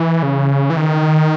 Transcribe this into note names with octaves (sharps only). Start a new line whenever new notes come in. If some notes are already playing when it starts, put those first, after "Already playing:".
Already playing: E3
C#3
E3
D#3